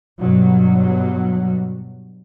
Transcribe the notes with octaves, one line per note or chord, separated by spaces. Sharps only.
G2 B2 F#3